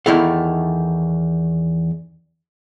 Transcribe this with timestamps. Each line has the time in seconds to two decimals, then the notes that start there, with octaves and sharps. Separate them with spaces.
0.06 E2 D#3 D#4 E4 A4 F5